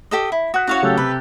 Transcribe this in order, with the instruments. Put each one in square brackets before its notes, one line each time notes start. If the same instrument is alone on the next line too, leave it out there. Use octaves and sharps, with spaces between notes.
[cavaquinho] G4 A4 D#5
E4
[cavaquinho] F#4 [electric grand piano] D#6 F#6 B6
[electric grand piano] C#4 E4 [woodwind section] F#4 [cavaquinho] C#5 F5 F#5
[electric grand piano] C#3 F#3 A3 [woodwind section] G4 A4
[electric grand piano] C3 [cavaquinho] B4